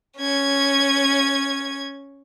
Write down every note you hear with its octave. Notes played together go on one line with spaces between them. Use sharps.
C#4 G#6